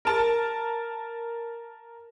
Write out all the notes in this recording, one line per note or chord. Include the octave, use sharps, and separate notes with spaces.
A#4 A5